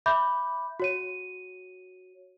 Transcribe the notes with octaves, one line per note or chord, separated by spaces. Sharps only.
E5 B5 D6 G6
F#4 C#5 D#7